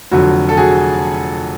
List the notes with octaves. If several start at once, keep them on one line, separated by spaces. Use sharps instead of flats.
F1 F2 D3 F#3 F#4
A4
F#4 G#4